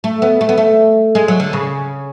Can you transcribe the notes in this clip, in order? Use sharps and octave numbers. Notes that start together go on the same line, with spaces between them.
A3
B3
A3
B3
A3
G#3
F#3
D3
C#3